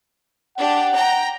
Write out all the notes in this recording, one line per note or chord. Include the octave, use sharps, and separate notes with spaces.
D4 G4 F#5
G5 A#5